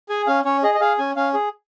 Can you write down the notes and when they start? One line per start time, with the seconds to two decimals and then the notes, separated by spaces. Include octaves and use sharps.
0.09 G#4 G#5
0.27 C#4 F5
0.45 C#4 C#5
0.63 G#4 D#5
0.74 D#5
0.80 G#4 F5
0.98 C#4 G#5
1.16 C#4 F5
1.34 G#4